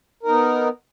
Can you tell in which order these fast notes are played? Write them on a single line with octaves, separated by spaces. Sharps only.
A#4 D#4 B3